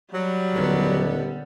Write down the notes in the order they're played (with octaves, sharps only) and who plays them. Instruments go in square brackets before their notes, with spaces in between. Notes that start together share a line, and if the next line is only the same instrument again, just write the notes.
[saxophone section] F#3 [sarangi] G3
[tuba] D#1 [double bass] D3 B3